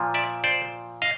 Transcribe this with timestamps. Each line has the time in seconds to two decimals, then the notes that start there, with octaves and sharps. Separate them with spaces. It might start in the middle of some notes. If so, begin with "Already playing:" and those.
Already playing: A#2 F3
0.14 D5 E5
0.44 C5 D5
1.02 D#5 F5